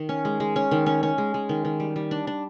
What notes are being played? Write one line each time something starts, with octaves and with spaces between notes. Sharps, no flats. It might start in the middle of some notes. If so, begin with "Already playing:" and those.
Already playing: D#3
C#4
G#3
G#3
C#4
D#3
C#4
C#4
G#3
G#3
D#3
D#3
G3
G3
D4
D4